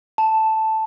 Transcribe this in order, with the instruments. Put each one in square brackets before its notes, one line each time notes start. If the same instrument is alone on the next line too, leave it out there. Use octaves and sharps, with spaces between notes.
[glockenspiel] A5